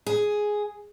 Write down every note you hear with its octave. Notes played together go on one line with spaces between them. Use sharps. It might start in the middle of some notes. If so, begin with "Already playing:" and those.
G#4